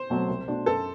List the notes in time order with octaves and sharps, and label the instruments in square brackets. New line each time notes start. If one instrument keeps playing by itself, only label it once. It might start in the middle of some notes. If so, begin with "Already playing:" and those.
Already playing: [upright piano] C5
[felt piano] B2 F#3 A3 C4
C2
B2 A3 D4 F#4
[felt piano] F#2 [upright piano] A4